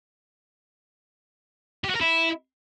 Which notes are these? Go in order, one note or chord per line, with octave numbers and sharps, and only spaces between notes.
G4
F#4
A#4
E4